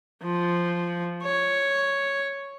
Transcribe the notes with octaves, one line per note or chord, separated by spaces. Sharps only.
F3
C#5